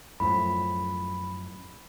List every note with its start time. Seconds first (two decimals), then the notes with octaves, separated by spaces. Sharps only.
0.20 F#2 A2 F3 B5